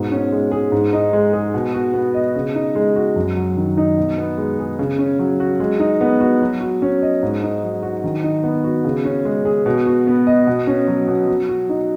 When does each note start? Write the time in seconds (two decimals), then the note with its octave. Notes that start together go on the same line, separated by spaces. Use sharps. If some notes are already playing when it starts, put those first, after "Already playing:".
Already playing: G#2 B2
0.12 C#4
0.32 G#3
0.51 G#4
0.72 G#2
0.93 D#4
1.13 G#3
1.33 G#4
1.54 B2
1.74 F#4
1.94 B3
2.14 D#5
2.35 C#3
2.55 D#4
2.75 G#3
2.96 F#4
3.16 F#2
3.36 F#3
3.57 D#3
3.77 D#4
3.98 B2
4.18 B3
4.38 G#3
4.59 G#4
4.79 C#3
4.98 C#4
5.19 F#3
5.40 F#4
5.60 G#3
5.79 D#4
6.01 B3
6.20 F#4
6.40 F#3
6.61 F#4
6.82 C#4
7.02 D#5
7.23 G#2
7.43 D#4
7.63 F#3
7.83 F#4
8.04 D#3
8.24 D#4
8.43 B3
8.64 F#4
8.84 C#3
9.05 C#4
9.25 G#3
9.45 G#4
9.66 B2
9.87 F#4
10.07 B3
10.27 D#5
10.47 B2
10.67 C#4
10.87 F#3
11.08 B2
11.28 F#3
11.49 F#4
11.69 D#4